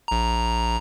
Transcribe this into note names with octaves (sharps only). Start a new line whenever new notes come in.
A#1 A#5